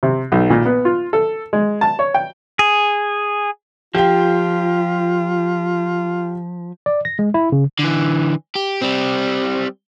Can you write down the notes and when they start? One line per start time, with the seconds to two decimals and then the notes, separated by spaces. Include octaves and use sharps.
0.03 C3
0.32 B1
0.50 A#2
0.65 B3
0.85 F4
1.13 A4
1.53 G#3
1.81 A5
1.99 C#5
2.14 G5
2.59 G#4
3.95 F3 F4 G4 G5
6.86 D5
7.05 A#6
7.19 G#3
7.34 E4
7.52 C#3
7.79 D3 E3
8.56 G4
8.82 G3 C4